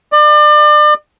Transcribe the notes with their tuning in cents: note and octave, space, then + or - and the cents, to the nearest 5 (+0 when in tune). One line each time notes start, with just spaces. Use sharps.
D5 +35